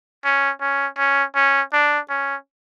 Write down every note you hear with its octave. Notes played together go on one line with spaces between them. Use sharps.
C#4
C#4
C#4
C#4
D4
C#4